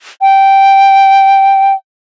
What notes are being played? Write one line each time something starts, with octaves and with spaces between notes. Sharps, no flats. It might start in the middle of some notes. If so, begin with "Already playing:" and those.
G5